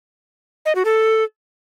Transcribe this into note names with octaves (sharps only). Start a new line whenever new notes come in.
D#5
F#4
A4